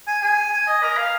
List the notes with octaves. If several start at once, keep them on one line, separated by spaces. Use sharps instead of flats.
G#5
G#5
G#5
D#5
A#4
F5